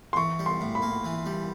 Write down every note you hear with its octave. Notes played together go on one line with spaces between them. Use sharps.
C6
E3 C#6
G3
C6
A2
B5
A#3
E3
G3